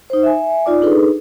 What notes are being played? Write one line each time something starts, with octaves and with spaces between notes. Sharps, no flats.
D#4 C5
E5 G#5
D#4 F4 D5 D6
D4 D#4 G#4 A4 B4